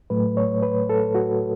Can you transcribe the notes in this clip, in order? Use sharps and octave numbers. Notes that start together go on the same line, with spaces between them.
A2 F#3 A3 B4
C#5
B4
A4
F#4